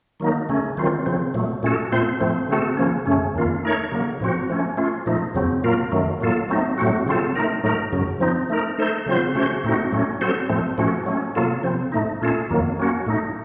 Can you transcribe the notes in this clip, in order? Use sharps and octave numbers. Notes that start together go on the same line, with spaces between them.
D#3 F#3 A#3 D#4
C#3 A3 C#4
D#3 F#3 C4 F4
C#3 F3 C4
A#2 F#3 A3
A#2 A3 C#4 F#4 A4
A#2 A3 C4 F4 C5
A2 F3 A3 C4
C#3 A3 C4 F#4 A4
C#3 F3 A#3 C#4
F#2 C#3 A3 C#4
F2 D#3 A#3 F4
A3 D#4 A#4 C#5
C#3 F#3 A#3
A2 F3 C4 F#4
F3 A3 C#4
A3 C#4 F4
A#2 F3 A3 D#4
F2 C#3 F#3 C4
A#2 F#3 A#3 F4 A#4
F#2 D#3 F#3 A3
A2 F#3 A#3 F4 A4
F#3 A3 C4 D#4
A2 F#3 A3 C4 F#4
C#3 F#3 C4 F4 A4
A3 D#4 A#4
A2 F#3 A3 D#4 A#4
F#2 C#3 F#3
F3 C4 D#4
A3 D#4 A#4
A3 D#4 A4 C5
C#3 F#3 C4 F4 C5
C#3 A3 C#4 F#4 C5
A2 A3 C4 D#4 F#4
A2 F#3 A3 C#4
F#3 C4 F#4 A4 C5
A2 F3 A3 C4
A2 F3 A3 C#4 F#4
F#3 A3 C#4
C3 F#3 A#3 F4 A4
C3 F3 C4
A2 A3 D#4
A#2 A3 C#4 F4 A4
F2 D#3 F#3 A#3
F#3 A#3 C#4 F#4
A2 A3 D#4